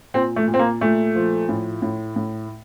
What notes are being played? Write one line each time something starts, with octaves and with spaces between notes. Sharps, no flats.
A#2 C4
A3
A#2
C4
A#3
A#2 A3
F3
A2
A2
A2